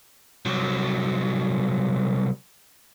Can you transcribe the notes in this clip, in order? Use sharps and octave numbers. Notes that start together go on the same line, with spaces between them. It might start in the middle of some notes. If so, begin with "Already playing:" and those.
C2 F#3